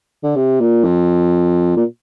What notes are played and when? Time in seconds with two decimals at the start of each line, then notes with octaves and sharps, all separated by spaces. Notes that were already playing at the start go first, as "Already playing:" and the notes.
0.23 D3
0.36 C3
0.60 A#2
0.84 F2
1.77 A#2